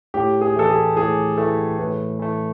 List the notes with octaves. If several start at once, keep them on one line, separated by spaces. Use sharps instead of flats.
A2 G4
G#4
E3 A3 A4
G#4
A2 G#4
E3 A3 A4
A2 B4
E3 A3